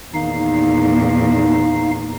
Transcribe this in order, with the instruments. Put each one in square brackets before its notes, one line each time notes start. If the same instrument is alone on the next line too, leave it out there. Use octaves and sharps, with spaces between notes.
[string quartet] E2 A#2 [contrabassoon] D#3 [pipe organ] D#4 F5